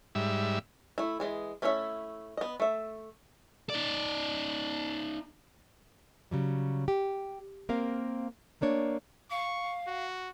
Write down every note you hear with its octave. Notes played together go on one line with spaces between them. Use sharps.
G#2 G3 E5
A3 E4
E3 G#3 G#4
A3 C#4 E4 C#5 E5
B3 D#5
A3 E5
D#4 D5
C#3 F#3 G3
G4
A#3 C4 A#4 F5
A3 A#3 D4 C#5
F5 C#6
F#4